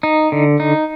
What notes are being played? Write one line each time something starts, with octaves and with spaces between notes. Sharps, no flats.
D#4
D3
D#4